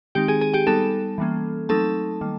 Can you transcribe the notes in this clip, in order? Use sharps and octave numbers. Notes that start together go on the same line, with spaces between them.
D#3 G#3 C4 D#4 G4 G5
G#4 G#5
G#4 G#5
G4 G5
G3 B3 D#4 A4 A5
E3 G3 A#3 C#4
F#3 A3 C4 D#4 A4 A5
D#3 G3 A#3